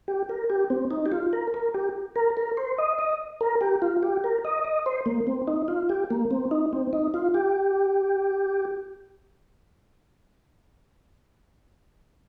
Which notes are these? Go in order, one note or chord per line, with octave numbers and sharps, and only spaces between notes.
G4
A#4
G4
C4
D#4
G4
F4
A#4
A#4
G4
A#4
A#4
C5
D#5
D#5
A#4
G4
F4
G4
A#4
D#5
D#5
C5
A#3
C4
D#4
F4
G4
A#3
C4
D#4
C4
D#4
F4
G4